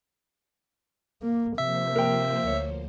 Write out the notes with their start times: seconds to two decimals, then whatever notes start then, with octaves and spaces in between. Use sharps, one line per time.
1.22 A#3
1.58 C3 F3 A#3 C5 E5
1.96 A#4 G5
2.47 D2 C#5